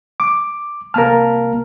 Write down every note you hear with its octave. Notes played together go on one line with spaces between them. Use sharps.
D6
C2 A#3 A#4 A5 F6